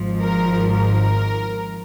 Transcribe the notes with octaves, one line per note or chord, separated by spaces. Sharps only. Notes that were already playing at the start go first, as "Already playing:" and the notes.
Already playing: G#1 G#2 F3
A#4
A#4